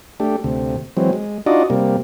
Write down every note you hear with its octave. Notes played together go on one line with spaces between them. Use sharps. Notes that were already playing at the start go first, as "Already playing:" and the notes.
A3 D4 G4
D2 C3
E3 F#3 G#3 C4
G#3
D4 D#4 F4 F#4 D5 D#5
C3 G3 A#3